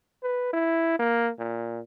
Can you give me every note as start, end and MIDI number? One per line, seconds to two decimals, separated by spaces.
0.23 0.52 71
0.53 0.97 64
0.99 1.30 58
1.39 1.80 46